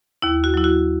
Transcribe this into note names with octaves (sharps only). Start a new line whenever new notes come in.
D#2 E4
F#4
F#3 E4
F#4